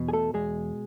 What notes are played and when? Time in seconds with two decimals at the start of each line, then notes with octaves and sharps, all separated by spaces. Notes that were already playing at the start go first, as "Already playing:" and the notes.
Already playing: E2 B2
0.08 G#4
0.13 A3 A4
0.34 E2 G#3 G#4